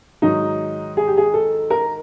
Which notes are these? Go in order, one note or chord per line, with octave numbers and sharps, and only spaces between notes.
G#2 D#3 F#3 D#4
G#4
G4
G#4
A4
A#4